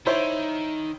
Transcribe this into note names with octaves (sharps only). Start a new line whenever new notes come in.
D#3 E4 C5 C#5